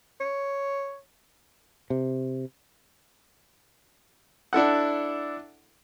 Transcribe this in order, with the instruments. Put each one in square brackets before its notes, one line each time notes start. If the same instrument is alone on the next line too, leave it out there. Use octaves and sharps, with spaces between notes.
[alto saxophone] C#5
[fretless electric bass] C3
[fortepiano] D4 E4 A4 F#5